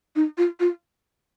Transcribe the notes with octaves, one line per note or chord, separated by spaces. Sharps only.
D#4
F4
F4